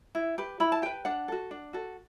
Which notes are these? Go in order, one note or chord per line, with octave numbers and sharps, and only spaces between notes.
E4
G4 B4
E4 B5
A5
G4 B4 G5
D4 F#5
F#4 A4
D4
F#4 A4